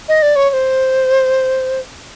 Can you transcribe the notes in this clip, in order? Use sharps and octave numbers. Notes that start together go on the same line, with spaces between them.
D#5
D5
C#5
C#5
C5